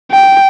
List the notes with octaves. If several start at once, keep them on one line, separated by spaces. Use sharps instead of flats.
G5